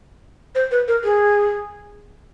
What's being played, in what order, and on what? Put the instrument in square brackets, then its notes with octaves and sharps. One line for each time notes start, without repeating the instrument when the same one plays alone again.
[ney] C5
B4
A#4
G#4